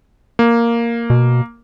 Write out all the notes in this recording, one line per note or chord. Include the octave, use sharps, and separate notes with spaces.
A#3
B2